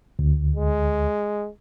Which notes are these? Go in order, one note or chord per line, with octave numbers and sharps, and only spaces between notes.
D2
G#3